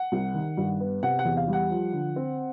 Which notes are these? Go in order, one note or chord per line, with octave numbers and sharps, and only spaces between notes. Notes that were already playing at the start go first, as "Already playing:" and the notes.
Already playing: F#5
C2
D#3
G2
B3
C3 F#5
F#5
E2
F5
G3
F#5
F3
D3
C4